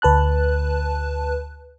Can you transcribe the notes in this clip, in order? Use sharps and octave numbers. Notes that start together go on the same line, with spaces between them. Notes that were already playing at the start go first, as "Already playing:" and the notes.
D2 B4 A5 F#6